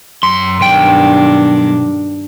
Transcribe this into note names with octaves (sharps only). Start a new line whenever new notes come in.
F#2 C6
B1 G2 D#3 D4 G5